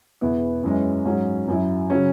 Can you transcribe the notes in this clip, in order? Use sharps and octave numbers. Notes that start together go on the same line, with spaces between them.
E1 E2 E3 B3 E4
F#2 E3 G#3 C#4
G#2 F#3 C#4
F#2 F#3 E4
C#3 F#3 C#4